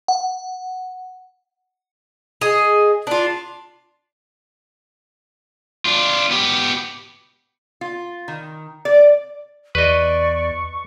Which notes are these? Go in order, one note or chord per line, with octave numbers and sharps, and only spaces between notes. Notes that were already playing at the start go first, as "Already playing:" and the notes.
F#5
G#4 D#5
D4 F4
D4 F4
B3 G4
F4
D#3
D5
E2 B4 D5 D#5 C#6